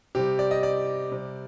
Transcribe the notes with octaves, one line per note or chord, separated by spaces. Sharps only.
C3 G3 G4
D5
D#5
D5
C3 G3